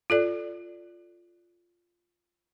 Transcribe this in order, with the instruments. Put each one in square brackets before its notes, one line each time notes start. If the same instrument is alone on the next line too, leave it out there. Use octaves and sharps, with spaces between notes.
[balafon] F4 A4 D5